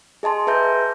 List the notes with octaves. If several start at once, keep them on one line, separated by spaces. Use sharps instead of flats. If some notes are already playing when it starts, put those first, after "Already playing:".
G#4 D#5 A5 C6
G#4 B4 E5 A#5 G6